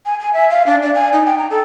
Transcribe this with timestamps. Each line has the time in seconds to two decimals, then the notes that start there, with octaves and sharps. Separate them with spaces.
0.06 G#5
0.20 G#5
0.33 E5
0.50 F5
0.66 D4
0.82 D5
0.94 G#5
1.13 D#4
1.26 G5
1.38 A#5
1.50 A4